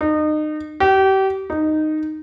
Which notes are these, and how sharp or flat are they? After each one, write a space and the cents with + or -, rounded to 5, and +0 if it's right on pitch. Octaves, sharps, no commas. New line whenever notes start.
D#4 -30
G4 -30
D#4 -10